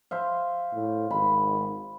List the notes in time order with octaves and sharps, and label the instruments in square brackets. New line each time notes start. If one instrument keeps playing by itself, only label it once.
[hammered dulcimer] C5 E5 F5
[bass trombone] A2
[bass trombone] G#1 [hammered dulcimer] B5